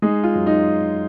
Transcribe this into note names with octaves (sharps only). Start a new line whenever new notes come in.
G#3 D#4 G#4
F4
F#2
D#4